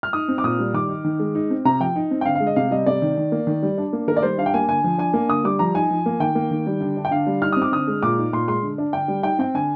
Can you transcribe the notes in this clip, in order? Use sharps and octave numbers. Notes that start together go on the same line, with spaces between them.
F6
D#4 D#6
C4
D6
A#2 D#6
G3
D#3 D6
D#4
D#3
G#3
D#4
C4
C3 A#5
F3 G5
D#4
C4
G5
D3 F5
F5
G#3
D#5
C3 F5
G3 D#5
C3 D5
D#3
D#3
A#3
D#3
G3
D4
A#3
D#3 A#4
D5
G3 C5
D4 F5
G5
A#3 G#5
D3 G#5
F3
D4 G#5
A#3
D3 D#6
G3 D6
F3 A#5
D#4 G#5
F3
A#3
D#3 G5
A#3
D#3
G3
D3
D4
G5
D3 F5
G3
D#4 F6
C4 D#6
D6
D3 D#6
G#3
A#2 D6
D#4
A#2 C6
G#3 C6
D3
D4
D3 G5
G3
D#4 G5
C4 G5
D3 G#5